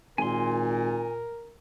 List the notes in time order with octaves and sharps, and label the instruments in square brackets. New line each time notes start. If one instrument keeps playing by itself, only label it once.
[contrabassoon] G#1 [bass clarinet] A#2 [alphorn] A#4 [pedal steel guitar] G#5 C6